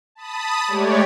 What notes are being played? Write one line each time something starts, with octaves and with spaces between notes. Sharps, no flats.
A5 B5 D#6
G#3 A3 G4 C#5 D5